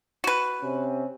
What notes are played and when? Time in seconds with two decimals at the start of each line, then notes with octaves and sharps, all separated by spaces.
0.24 F#4 B4
0.62 C3 C4 C#4